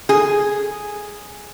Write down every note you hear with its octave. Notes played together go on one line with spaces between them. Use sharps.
G#4